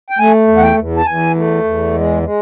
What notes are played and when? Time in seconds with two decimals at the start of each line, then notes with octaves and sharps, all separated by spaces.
0.10 G5
0.19 A3 G#5
0.48 E2
0.57 F#5
0.63 G5
0.77 E2
0.97 A5
1.06 E2 G#5
1.35 A3
1.64 E2
1.94 G#3
2.23 G#3